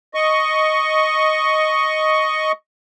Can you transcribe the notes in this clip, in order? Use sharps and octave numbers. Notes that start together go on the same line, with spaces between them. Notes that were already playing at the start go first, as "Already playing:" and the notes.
D#5 C#6